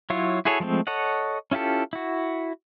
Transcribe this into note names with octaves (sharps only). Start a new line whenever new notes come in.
F#3 E4 F4 C#5
E4 F#4 G#4 A4 C#5
F3 G#3 A3 C4
A4 C#5 D#5 F#5
C#4 E4 F4 G4 A4
E4 F#4